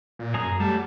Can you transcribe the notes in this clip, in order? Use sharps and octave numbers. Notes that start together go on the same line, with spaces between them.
A#2
F#2 G#4 A#5 D#6
F#3 G3 A3 A5